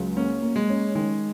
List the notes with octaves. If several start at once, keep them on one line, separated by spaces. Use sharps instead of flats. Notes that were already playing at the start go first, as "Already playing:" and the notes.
Already playing: C#2 F#3
A#3 C#4
A#3
G#3
C#4
D#3 G#3